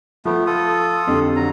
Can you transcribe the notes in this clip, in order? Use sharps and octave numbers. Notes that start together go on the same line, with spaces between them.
F3 A3 B3
F4 A4 D#6
F2 D3 G4
F#3 A#5